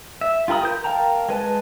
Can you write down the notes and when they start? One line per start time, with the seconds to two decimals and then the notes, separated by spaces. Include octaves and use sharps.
0.21 E5
0.48 F4 G4 A#4 B5 D#6
0.63 A#4 G6
0.84 A#4 F5 G5 A5 A#5
1.29 G#3 B4 A5